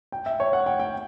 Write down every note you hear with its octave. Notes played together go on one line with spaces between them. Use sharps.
G5
E5
C#5
F#5
G5
G5